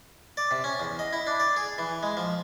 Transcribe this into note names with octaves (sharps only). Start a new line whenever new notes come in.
D5
C3
C#4
E2
D#5
E4
D4
D5
G#4
E3
G#3
F3